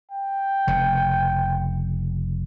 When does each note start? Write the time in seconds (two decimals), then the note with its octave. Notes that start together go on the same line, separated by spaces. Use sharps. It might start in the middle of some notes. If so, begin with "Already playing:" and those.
0.11 G5
0.67 F1 C#3